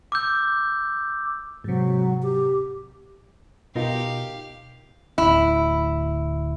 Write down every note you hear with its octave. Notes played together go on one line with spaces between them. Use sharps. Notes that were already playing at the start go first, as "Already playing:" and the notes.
D6 E6 G6
G#2 C3 F#3
G4
B2 D#4 F4 G4 A#4 F5
D1 G#1 D2 E4